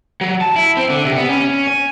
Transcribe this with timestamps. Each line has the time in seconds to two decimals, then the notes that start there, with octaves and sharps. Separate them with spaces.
0.21 F#3
0.41 A5
0.56 E4
0.77 C4
0.90 D3
1.05 C3
1.16 B3
1.29 C#4
1.67 G#5